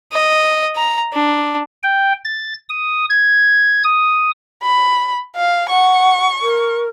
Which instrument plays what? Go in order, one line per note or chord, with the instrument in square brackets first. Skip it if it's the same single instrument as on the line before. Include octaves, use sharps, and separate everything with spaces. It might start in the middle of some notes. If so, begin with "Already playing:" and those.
[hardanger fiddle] D#5
A#5
D4
[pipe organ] G5
A6
D#6
G#6
D#6
[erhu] B5
F5
[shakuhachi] F#5 [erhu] C#6
[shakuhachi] A#4